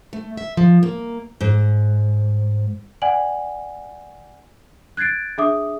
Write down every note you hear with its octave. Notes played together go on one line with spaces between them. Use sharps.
A3
E5
F3
A#3
G#2
D5 F#5 G#5 F#7
F#6 G#6 A6 C7 D7
D4 G#4 E5 D6 D#6